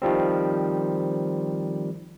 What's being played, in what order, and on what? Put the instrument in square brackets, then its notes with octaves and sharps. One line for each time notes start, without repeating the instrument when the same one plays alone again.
[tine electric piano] D#3 F3 G3 C4